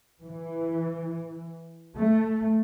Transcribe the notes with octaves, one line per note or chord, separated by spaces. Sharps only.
E3
A3